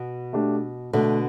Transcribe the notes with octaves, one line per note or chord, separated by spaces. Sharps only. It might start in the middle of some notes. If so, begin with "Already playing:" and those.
Already playing: B2
A3 D4 G4
B2 D3 A3 D4 A4